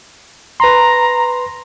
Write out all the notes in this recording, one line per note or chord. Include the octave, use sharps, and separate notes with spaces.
B4 A#5 C6